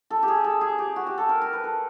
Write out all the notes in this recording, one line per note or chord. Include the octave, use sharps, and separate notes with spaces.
A4
G4
G#4
A4
G#4
G4
F#4
G4
A4
A#4
A#4
B4
A4